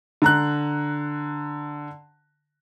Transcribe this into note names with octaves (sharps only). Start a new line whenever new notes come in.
D3 A#5 F#6